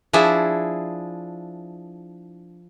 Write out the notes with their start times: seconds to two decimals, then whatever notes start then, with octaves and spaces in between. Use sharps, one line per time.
0.13 F3 D4 E4 G#4 E5